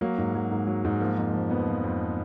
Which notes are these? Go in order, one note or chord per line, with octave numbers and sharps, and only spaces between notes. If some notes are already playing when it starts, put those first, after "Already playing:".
F#3 A#3
G#2
F#3
G#2
F#3
G#2
F3 A#3
F2
F3
F2 B3
F3
F2